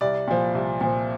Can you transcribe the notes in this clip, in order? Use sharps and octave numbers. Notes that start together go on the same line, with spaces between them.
C2 D5
A#2 F3
C2
A#2 F3